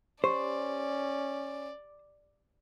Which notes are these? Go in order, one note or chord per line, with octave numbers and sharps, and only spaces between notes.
C#4 G4 C5 D5